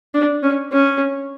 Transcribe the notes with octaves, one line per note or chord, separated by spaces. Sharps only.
D4
C#4
C#4